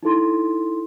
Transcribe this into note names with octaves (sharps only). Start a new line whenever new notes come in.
D#4 E4 A4 C6